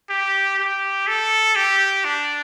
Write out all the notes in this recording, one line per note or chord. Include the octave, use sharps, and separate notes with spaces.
G4
G4
A4
G4
D4